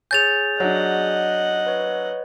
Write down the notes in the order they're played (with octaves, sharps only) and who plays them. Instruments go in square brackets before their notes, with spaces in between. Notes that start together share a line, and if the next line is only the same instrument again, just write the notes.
[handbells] G#4 C#5 G#5 [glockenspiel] G6 A6 F7
[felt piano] F#3 D4 [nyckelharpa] D#5 F#5
[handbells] B4 C#5